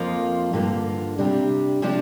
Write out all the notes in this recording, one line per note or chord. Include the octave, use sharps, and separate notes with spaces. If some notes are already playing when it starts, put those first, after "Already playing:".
Already playing: F2 F3 A#3 F4
G2 D3 A#3 F4
C3 G3 D4 G4
C3 F3 D4 G4